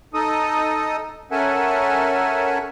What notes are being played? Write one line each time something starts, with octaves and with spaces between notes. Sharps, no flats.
D#4 A4 D#5 D#6
C#4 A4 A#4 E5 F#5 G#5